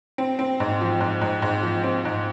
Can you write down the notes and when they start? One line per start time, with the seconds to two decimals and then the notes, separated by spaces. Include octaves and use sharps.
0.18 C4
0.39 C4
0.60 G#2
0.81 F3
1.00 G#2
1.21 G#2
1.42 G#2
1.63 F3
1.84 C4
2.05 G#2